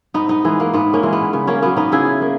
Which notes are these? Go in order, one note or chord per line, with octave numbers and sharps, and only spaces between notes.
G#2 B3 D#4
B3 D#4
E3 G#3 B3
A#3
G#2 B3
A#3 C#4
E3 G#3
B3
C#3 B3
A#3 C#4
F#3 A#3 B3
B3 D#4
C#3 E4 G#4
A#3